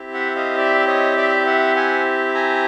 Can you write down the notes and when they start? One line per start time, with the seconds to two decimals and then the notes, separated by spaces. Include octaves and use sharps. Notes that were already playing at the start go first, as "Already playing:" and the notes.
Already playing: C4 E4 G4
0.14 E5 F#5
0.35 D#5 F5
0.58 D5 E5
0.87 C#5 D#5
1.17 D5 E5
1.46 E5 F#5
1.76 F#5 G#5
2.34 G#5 A#5